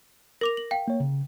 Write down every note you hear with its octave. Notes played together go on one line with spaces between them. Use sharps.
A#4 D6 A#6 F7
F#7
F5 G5
A#3 C#5
C#3